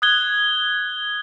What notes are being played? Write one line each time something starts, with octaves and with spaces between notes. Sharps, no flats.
D#6 F#6 G#6 G7